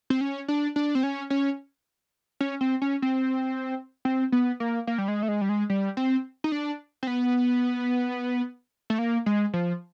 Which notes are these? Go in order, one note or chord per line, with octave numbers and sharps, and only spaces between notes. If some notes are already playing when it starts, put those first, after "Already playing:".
C4
C#4
D4
D4
C4
C#4
C#4
C#4
C4
C#4
C4
C4
B3
A#3
A#3
G3
G#3
A3
G#3
G3
G#3
G3
C4
D#4
D4
C4
B3
A3
A#3
G#3
F3